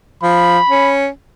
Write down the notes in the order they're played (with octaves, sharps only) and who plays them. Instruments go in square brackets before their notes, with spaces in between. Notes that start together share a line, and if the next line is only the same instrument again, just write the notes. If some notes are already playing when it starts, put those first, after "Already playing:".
[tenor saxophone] F3 [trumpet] B5
[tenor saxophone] C#4